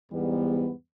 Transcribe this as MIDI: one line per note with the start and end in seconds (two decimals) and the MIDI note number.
0.12 0.71 40
0.12 0.71 44
0.12 0.71 55
0.12 0.71 59